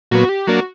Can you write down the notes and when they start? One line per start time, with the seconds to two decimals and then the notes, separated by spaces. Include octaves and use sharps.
0.11 A#2 F#3 B3 F#4
0.29 G4
0.47 F#3 A#3 D4 F#4